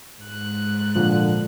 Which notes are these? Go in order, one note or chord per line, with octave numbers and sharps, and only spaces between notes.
G#2 F#6
A#2 D3 F3